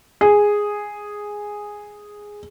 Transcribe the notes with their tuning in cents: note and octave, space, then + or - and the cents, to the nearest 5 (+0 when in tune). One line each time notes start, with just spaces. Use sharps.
G#4 -5